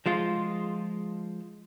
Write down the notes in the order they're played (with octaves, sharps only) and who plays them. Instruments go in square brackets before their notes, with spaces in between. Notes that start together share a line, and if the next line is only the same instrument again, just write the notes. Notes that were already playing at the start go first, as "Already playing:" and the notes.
[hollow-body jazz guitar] F3 G#3 F4